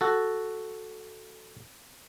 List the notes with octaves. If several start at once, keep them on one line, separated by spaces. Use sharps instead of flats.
F#4 A4